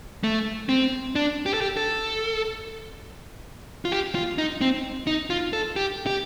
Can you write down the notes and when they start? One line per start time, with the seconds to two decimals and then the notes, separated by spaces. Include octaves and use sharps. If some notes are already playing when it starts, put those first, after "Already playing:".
0.24 A3
0.69 C4
1.15 D4
1.46 G4
1.54 A4
1.61 G4
1.77 A4
3.85 F4
3.92 G4
4.15 F4
4.38 D#4
4.61 C4
5.07 D#4
5.30 F4
5.53 A4
5.76 G4
6.06 G4